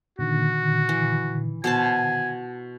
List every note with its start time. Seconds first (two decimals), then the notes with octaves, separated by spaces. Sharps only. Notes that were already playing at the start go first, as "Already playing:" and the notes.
0.19 A#2 D3 D#3 F#4
0.89 E3
1.64 B2 C5 G#5 A5